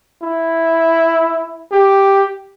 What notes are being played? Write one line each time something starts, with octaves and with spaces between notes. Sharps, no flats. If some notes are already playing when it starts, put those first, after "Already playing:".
E4
G4